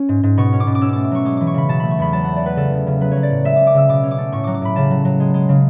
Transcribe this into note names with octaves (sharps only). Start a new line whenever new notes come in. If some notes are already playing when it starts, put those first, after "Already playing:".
Already playing: C#4
G#2
G#2
B2 C#6
C#4
D6
B2
D6
C#4 E6
A3 D6
D6
F#3 C#6
G#3 D6
E3 D6
C#6
C#3 B5
B2 A5
A3 B5
C#6
E2 B5
F#3 A5
A3 F#5
D5
A3 B4
C#3 A4
E2
C#3
F#3 B4
F#3 C#5
D5
A2
G#3 E5
C#4 D6
D6
C#3 E6
B2 D6
C#4
D6
A3
A2 C#6
F#3 D6
D6
A2 B5
C#3 A5
F#3
F#3
G#3
G#3
C#3